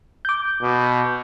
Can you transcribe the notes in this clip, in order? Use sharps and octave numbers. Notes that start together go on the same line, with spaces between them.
D6 G6
B2